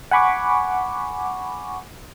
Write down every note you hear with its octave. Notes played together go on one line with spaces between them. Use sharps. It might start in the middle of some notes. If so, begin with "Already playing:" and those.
F#5 G#5 B5 C#6 D6